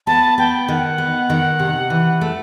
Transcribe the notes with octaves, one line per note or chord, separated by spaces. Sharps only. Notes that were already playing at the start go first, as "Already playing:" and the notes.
B3 A5
B3 G5
D#3 F#5
B3
D#3
C3
E3
A3